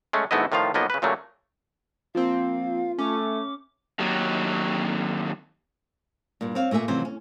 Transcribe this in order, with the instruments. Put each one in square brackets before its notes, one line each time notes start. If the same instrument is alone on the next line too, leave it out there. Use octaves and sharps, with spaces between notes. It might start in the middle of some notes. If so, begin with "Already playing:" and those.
[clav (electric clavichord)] G#3 A3 C#4
G1 G#2 A3 B3 E4 D#5
A2 D#3 F3 F4 F5
B1 F3 A#3 B3 D#5
C#3 B4
A#2 C#3 F#3 A3 A#3
[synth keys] F3 A#3 C4 [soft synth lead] F4 [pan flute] F5
[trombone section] A3 [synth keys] C#4 [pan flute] D6
[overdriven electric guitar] D#2 F#3
[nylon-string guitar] G2 A#2
C4 C#5 F5
A#2 A3 A#3 E5 G#5
F2 C3 E3 F#3 C#4 C5
C#4